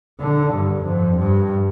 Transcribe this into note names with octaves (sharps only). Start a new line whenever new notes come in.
D3
G2
F2
G2